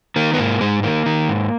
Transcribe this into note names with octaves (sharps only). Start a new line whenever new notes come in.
D#3 A#3
B3
G#2 A#3
G#2 G#3
D#3 A#3
D#3
G#2